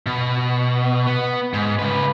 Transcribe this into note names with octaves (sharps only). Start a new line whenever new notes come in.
B2
B3
G#2
C#3 B4